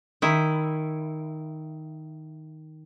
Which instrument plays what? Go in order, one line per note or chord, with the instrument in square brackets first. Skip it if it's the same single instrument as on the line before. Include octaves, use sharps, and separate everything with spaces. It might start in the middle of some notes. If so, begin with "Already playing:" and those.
[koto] D#3 E4